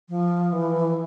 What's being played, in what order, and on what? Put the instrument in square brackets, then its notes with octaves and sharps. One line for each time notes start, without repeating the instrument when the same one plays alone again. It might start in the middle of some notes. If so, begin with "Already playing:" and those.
[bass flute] F3
E3